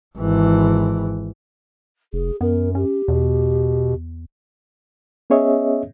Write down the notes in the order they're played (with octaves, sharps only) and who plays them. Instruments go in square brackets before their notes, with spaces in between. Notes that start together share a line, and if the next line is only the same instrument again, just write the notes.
[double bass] G#1 E3
[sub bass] F1 [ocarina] G#4
[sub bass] F#2 [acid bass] B3 [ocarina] A#4
[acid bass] C#4 [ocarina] G4
[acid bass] E2 [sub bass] B2
[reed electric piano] B3 C#4 G#4 C#5 D#5 E5